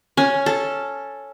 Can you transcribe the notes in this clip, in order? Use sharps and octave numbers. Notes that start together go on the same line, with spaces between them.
C#4
A4